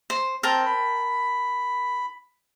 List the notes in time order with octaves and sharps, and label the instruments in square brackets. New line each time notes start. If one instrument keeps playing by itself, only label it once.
[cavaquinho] C5
[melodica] C4 [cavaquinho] A#4 G5 A5
[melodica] B5